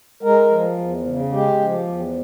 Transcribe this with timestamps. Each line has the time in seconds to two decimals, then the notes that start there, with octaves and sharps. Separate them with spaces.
0.23 G#3 A#4
0.51 F3
0.78 E2
1.05 C#3
1.33 G#3 G4
1.60 F3
1.87 E2